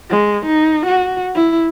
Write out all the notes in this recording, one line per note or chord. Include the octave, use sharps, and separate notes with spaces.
G#3
D#4
F#4
E4